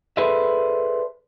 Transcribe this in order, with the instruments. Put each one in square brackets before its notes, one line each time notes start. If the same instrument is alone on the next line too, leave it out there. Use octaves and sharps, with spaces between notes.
[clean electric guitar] G#4 A4 B4 C5 D5 E5